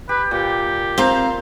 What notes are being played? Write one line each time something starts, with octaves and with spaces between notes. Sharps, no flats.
G4 B4
A#2 G4
C4 C5 F5 A#5